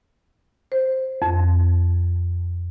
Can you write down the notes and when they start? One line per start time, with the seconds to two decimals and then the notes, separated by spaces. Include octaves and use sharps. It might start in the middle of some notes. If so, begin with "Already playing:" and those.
0.72 C5
1.22 F2